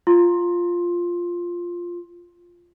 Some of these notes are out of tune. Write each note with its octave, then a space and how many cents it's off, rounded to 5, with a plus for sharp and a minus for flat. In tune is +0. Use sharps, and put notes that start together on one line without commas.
F4 +0 C6 +15